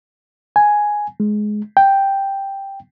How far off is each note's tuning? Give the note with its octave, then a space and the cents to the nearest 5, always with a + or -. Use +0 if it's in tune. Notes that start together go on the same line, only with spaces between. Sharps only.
G#5 +0
G#3 +15
G5 +0